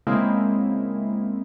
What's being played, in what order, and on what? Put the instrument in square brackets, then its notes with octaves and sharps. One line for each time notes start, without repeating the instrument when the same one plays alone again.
[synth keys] C#3 G#3 A#3 C4 E4